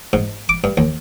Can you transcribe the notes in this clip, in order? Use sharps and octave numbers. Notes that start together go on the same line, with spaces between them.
G#2
D6
G2
D#2